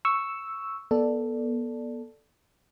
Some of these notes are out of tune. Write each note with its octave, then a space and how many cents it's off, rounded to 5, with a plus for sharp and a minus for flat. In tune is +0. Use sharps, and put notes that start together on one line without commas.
C#6 +0 E6 +0
B3 -30 A4 +0 D5 +5